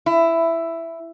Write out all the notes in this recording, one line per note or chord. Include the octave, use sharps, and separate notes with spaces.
E4